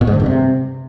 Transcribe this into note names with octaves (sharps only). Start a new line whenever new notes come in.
A#2
G#2
D3
G2
C3